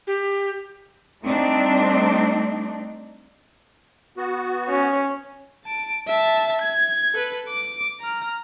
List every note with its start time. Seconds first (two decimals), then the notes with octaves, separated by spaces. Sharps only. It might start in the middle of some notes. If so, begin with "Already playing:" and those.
0.07 G4
1.23 G3 A3 C4 D4 D#4
4.17 B3 F#4
4.69 C#4
5.65 A5 D7
6.08 E5 A5
6.61 G#6
7.14 A4 B4
7.48 D6
8.00 A#5 F6